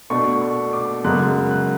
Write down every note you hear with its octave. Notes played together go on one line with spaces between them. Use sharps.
B2 A3 D4 C#6
C#6
D6
F#2 C#3 G#3 B3 F#6
F#6